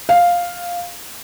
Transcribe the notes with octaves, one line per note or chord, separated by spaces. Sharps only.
F5